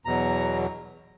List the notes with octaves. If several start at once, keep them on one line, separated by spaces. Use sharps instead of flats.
E2 B2 F#3 A#5